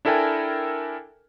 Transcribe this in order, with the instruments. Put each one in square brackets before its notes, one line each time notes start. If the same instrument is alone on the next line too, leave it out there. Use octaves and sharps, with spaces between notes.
[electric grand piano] D4 E4 A4 A#4 G5 G#5